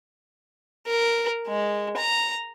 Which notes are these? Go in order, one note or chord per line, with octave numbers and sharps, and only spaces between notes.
A#4
G#3
A#5